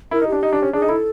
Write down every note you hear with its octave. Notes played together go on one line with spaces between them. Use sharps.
E4 A#4
D#4
D4 G4
D#4
D4
C#4
D4 G#4
D#4
E4 A4